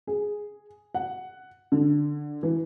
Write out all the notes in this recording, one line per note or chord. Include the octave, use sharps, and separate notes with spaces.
G#4
F#5
D3
E3